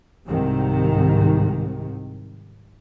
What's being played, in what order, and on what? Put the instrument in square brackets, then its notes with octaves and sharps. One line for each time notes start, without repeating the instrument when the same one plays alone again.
[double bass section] C2 G#2 C3 D#3